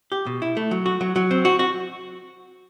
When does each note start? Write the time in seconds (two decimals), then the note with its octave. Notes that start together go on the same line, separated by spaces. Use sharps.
0.12 G4
0.27 B2
0.42 E4
0.57 A3
0.71 F#3
0.86 F#4
1.01 F#3
1.16 F#3
1.31 C4
1.45 F#4
1.59 F#4